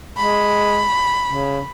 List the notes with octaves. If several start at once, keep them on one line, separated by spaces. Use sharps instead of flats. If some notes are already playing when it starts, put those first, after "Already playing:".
G#3 B5
C#3